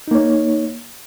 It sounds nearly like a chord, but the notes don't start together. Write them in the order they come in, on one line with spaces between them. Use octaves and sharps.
D#4 A#3 C#5